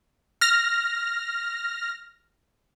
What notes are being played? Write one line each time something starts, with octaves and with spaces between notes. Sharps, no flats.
F6 A#6